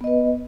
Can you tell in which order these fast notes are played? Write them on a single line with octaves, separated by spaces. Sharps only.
B3 D#5 B4